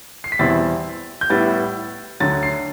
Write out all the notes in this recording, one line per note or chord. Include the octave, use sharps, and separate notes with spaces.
C7
B6
E2 B2 G3 C4 E4 A6
G6
A2 G3 B3 E4 A6
D2 D3 F#3 A6
C7